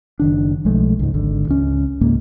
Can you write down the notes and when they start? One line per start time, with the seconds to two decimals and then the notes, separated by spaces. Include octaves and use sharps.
0.20 F#1 D#3 D4
0.65 B1 F3 G#3 A3
0.99 C#2 G#2
1.14 G#1 D3
1.48 C#2 C#4
2.01 C#2 G#2 A#3